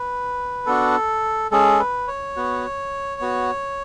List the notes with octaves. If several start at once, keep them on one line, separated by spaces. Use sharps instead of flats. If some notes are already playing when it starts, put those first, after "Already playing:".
Already playing: B4
B3 D4 F#4 A4
G#3 C#4 G#4 A4
B4
C#5
B3 F#4
B3 F#4